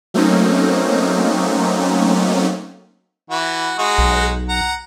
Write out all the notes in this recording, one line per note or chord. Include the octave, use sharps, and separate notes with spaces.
F#3 A3 A#3 C4 C#4 D#4
E3 F#4
G#3 D#4 F#4
B1
F#5 A#5